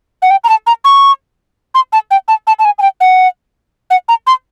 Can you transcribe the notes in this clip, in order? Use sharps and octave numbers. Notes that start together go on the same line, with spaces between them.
F#5
G5
A#5
A5
A#5
C#6
C6
A5
G5
A5
A5
A5
G#5
G#5
G5
F#5
F#5
A#5
C6